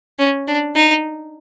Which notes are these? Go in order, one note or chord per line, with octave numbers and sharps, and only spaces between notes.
C#4
D4
D#4